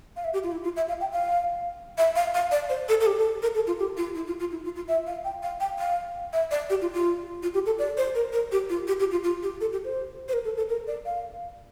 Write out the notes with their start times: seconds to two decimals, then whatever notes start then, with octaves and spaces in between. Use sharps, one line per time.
0.16 F5
0.24 E5
0.33 G4
0.43 F4
0.52 E4
0.64 F4
0.76 E5
0.88 F5
1.01 G5
1.13 F5
1.98 E5
2.16 F5
2.34 F5
2.51 D5
2.69 C5
2.89 A4
3.01 A4
3.06 G4
3.18 A4
3.42 A#4
3.55 A4
3.67 F4
3.79 G4
3.97 F4
4.15 E4
4.27 F4
4.40 F4
4.52 E4
4.64 F4
4.76 F4
4.88 E5
5.07 F5
5.24 G5
5.42 F5
5.60 G5
5.79 F5
6.33 E5
6.51 D5
6.70 G4
6.81 F4
6.93 F4
7.42 F4
7.54 G4
7.66 A4
7.79 D5
7.97 C5
8.15 A#4
8.32 A#4
8.52 G4
8.69 F4
8.87 G4
8.99 G4
9.11 F4
9.24 F4
9.43 G4
9.61 A4
9.72 G4
9.84 C5
10.28 C5
10.33 A#4
10.45 A4
10.57 A4
10.69 A#4
10.87 D5
11.06 F5